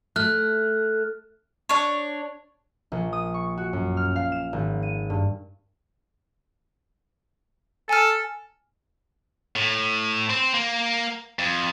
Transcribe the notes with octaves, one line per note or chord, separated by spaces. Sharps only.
A3 F6 F#6
D4 C#5
A#1
D#6
C#6
F#4
F#2
F6
F5
E7
G#1
D#7
G2
A4 G#5 F6
A2
C4
A#3
F2